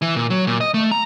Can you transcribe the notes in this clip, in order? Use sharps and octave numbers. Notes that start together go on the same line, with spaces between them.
E3
A#2
F#3
A#2
D#5
A3
A#5